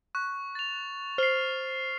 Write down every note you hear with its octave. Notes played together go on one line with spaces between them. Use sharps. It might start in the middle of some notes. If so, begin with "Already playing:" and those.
C#6 F#6
A6 F7
C5 F6 C7